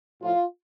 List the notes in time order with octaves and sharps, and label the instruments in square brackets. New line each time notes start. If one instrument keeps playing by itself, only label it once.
[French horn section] A2 F3 F4